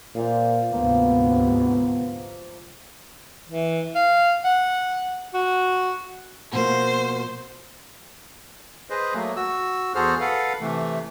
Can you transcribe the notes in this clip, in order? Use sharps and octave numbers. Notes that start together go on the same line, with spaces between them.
A#2 C5 D5 F5
D2 G#2 C3 F3 A#3 B3
E3
F5
F#5
F#4
B2 F3 A#3 C5
G#4 B4 C5 D#5
F#3 A3 A#3
F#4 E6
E2 F#4 G#4 A4 C5 F6
A4 B4 F5 F#5
C3 E3 A3